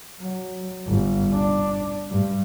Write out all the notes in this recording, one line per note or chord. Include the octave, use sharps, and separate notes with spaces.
F#3
G1
D4
G2